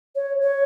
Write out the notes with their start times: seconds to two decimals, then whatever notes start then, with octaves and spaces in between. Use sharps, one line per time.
0.15 C#5
0.41 C#5